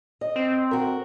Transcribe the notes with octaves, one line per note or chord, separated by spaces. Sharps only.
D#5
C4
F#4 A#4